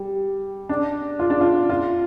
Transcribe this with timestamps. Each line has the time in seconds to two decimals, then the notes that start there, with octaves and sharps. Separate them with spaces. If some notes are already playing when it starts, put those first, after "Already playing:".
Already playing: G3
0.69 D4
1.19 F4
1.30 D4
1.41 F4
1.69 F4